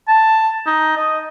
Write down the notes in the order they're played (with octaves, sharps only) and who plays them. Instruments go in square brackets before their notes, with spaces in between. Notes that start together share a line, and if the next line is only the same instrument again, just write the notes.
[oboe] A5
D#4
D#5